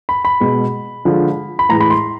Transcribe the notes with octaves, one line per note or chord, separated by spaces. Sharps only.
B5
B5
B2 G#3
D3 F3 G#3
B5
A2 E3 G#3 A#5
B5
C6